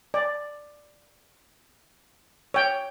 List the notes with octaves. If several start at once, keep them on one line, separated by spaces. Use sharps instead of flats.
D5
C#5 G5